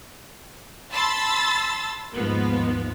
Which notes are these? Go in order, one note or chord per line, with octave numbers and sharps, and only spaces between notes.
A5 B5 C6 E6 A6
D#2 G#2 F3 B3